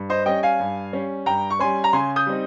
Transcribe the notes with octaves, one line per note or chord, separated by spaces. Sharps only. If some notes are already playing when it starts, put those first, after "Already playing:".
Already playing: G2
C5 D#5
G3 C#4 D#5 G5
F5 G#5
G2
G3 C#4
G2 G5 A#5
C#6
G3 C#4 G#5 C6
A#5
C#3 G#5 C6
D#6 G6
G3 C4 D#4